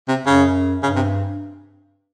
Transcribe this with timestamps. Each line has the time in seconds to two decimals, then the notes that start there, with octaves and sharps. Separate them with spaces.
0.08 C3
0.26 F#2 C#3
0.82 G2 C#3
0.96 C3